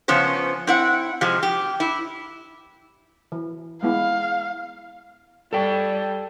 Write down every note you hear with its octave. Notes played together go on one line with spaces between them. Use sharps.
C#3 F3 B3 C#4 C5
C4 E4 F#5
C3 F3 G#3
G4
E4
E3
G#3 B3 E4 F5
G3 A4 G5